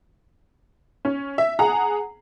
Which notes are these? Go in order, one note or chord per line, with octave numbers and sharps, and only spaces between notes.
C#4
E5
G#4 F#5 A#5